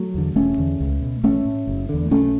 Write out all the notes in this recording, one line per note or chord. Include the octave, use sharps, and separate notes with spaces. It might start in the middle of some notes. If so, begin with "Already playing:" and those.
Already playing: F#3 A3
E2 D3
E1 A3 C#4
E2 D3
C#2
B2
A1 A3 C#4
A2
F#1
E2 D3
B1 A3 C#4